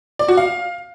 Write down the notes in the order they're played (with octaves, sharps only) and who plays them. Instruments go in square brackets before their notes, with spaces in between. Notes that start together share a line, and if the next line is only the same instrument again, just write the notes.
[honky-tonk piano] D5
F#4
F5